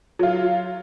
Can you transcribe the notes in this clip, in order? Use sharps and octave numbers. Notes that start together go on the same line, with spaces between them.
F#3 F4